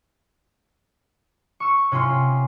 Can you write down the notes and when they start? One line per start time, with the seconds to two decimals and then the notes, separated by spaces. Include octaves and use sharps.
1.60 C#6 E6
1.92 C3 C#4 F4 C6 F6